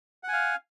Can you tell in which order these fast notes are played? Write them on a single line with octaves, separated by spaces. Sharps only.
F#5 G#5 F5